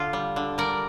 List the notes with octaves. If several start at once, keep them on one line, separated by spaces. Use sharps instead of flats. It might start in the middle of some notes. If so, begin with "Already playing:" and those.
Already playing: D3 F4
G3
D3
G3 A#4 D5